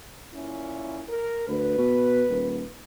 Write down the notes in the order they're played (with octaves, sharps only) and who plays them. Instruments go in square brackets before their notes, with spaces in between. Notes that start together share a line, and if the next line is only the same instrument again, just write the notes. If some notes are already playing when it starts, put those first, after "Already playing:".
[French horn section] A#2 C#4 E4
A#4
[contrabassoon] D2 [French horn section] B4
[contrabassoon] B2
D#1